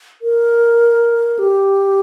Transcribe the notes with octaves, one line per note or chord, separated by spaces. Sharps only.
A#4
G4